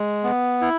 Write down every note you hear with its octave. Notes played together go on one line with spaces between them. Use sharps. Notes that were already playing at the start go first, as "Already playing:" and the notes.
Already playing: G#3
B3
E4